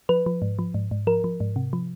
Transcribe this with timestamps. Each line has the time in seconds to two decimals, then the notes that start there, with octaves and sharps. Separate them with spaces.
0.09 F3 B4
0.26 F3
0.42 G#2
0.59 F3
0.74 G#2
0.91 G#2
1.07 F3 A#4
1.24 F3
1.40 G#2
1.56 C3
1.73 F3